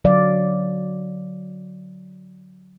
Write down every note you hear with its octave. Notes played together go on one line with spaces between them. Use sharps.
D3 F#3 D5 F5